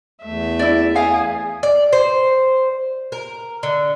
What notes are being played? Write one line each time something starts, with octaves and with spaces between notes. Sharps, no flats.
E2 A3 E5
E4 D5
G#4 F5
D5
C5
A#4
D3